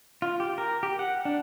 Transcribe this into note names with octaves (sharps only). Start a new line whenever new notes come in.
F4
G4
A#4
G4
F#5
D4